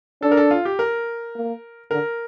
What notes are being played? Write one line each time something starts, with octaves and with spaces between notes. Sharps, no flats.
D4 A4
A#4
A4
F4
G4
A#4
A#3
D3 A#4